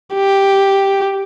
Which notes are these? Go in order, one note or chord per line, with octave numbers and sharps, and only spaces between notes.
G4